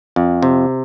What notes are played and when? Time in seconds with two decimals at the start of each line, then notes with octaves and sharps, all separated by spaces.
0.16 F2
0.43 C3